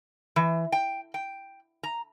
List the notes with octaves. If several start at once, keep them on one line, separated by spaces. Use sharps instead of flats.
E3
G5
G5
A#5